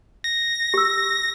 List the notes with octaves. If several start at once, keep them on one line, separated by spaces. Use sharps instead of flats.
A#6
G4 E6